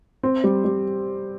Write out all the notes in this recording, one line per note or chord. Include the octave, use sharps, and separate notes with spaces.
C4
G3
G3